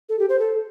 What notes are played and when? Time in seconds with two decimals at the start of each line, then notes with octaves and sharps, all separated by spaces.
0.09 A4
0.19 G4
0.29 C5
0.39 A4